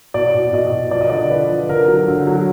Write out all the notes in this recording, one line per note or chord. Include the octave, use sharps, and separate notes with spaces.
B2 D5
B2
B2 D#5
B2
F3 D5
D#5
D3 D5
F3 B4
F3
D3 A#4
F#3
D3
F#3